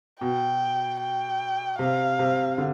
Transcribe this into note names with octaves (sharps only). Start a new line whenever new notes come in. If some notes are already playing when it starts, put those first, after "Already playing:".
B2 G5
G5
C3 F5
C3
D3